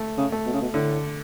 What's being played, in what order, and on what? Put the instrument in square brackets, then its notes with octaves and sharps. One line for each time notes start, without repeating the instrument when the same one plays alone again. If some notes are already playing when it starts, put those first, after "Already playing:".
Already playing: [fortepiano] A3
[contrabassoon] C#3
[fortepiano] A3
[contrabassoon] B2
C#3
B2
[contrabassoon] A2 [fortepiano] D3